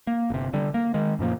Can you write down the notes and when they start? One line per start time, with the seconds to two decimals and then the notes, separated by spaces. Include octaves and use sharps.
0.07 A#3
0.30 G1 C3
0.54 D3 G3
0.74 A#3
0.94 D#3 G#3
1.19 F#2 A#2 F3 A#3